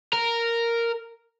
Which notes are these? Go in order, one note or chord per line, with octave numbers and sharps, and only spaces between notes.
A#4